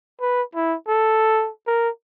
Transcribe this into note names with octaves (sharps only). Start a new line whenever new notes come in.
B4
E4
A4
A#4